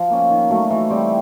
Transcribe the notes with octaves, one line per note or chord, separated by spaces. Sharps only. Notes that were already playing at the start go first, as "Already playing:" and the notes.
Already playing: F3
A#3 C#4
D#3
F#3 A3
E3
G3 C4